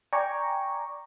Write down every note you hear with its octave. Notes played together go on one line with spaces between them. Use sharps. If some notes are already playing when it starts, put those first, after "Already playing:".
D5 G5 G#5 A#5 C#6 D6